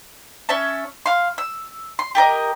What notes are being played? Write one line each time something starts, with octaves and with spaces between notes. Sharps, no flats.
C#4 C#5 E5 A5
F5 C6
E6
C6
G4 A4 A#4 D#5